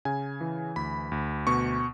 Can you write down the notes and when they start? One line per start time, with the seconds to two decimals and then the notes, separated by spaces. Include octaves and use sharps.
0.05 C#3 G#5
0.41 E3
0.76 D2 B5
1.12 D2
1.47 B2 C#6